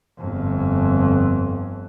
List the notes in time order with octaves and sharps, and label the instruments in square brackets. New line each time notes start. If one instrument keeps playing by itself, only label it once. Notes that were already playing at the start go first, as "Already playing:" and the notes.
[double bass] G1 F2